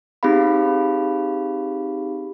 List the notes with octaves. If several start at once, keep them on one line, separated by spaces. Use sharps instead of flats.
C4 D#4 G4 G#4 F5 B5